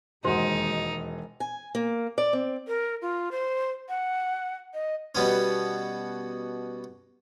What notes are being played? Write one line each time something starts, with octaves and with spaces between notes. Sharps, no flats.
E1 D#2 G#3 D#4 F#4 G#4 C5 F#5
G#5
A#3
D5
C4
A#4
F4
C5
F#5
D#5
B2 G3 B3 C#4